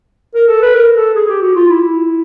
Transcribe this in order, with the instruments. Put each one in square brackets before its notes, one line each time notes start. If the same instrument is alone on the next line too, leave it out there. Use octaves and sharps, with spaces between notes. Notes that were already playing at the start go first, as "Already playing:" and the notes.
[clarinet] A#4
A4
B4
A#4
A4
G#4
G4
F#4
F4
E4
E4